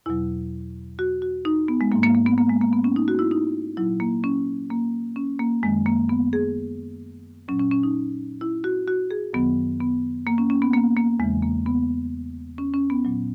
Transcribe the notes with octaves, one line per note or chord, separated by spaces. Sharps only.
E2 B2 F#3 E4
F#4
F#4
D#4
B3
G#3
G#2 F#3 A#3
A#3
A#3
B3
A#3
G#3
A#3
B3
C#4
D#4
F#4
E4
D#4
A#2 F#3 E4
A#3
C#4
A#3
C#4
A#3
F#2 D#3 F#3 G#3
A#3
B3
G#4
A#2 F#3 C#4
C#4
C#4
D#4
E4
F#4
F#4
G#4
F#2 D#3 F#3 B3
B3
A#3
C#4
C#4
B3
A#3
A#3
E2 C#3 E3 G#3
A#3
B3
C#4
C#4
B3
A#2 F#3